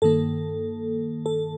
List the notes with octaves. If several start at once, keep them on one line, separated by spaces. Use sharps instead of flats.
G2 D#3 A#3 A4
A4